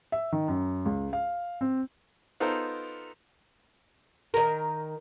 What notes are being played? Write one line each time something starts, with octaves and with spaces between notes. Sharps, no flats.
E5
D#3
F#2
C#2
F5
C4
B3 D#4 F4 A4 A#4 C5
D#3 A#4